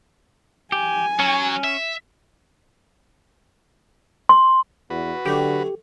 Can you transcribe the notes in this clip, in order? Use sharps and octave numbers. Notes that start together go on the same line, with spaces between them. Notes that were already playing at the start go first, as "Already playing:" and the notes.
G4 G#5
F#3 C#4
E5
C6
E2 F#4 B4
D3 F#3 A3 G4